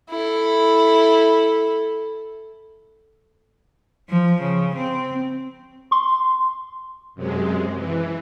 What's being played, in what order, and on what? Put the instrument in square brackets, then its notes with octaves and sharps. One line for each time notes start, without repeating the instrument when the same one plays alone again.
[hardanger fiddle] E4 A4
[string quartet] F3
C#3
C4
[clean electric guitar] C6
[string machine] F#2 C3 G#3
E3